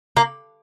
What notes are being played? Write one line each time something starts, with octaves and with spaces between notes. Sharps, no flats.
A#3